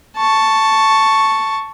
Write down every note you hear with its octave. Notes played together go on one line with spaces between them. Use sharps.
A5 C#6